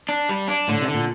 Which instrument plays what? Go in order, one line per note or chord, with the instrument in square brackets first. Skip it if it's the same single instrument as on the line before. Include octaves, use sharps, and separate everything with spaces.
[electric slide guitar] D4
G3
D4
[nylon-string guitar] A2 [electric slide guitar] D3
[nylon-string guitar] C3
[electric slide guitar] D3
[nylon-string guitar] A#2